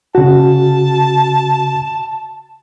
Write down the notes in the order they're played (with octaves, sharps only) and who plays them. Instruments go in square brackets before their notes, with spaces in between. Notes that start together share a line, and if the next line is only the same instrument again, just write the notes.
[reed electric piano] C#3 F#4 [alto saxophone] A5